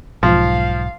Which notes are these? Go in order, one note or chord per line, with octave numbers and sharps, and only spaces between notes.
B1 G#2 F3 F5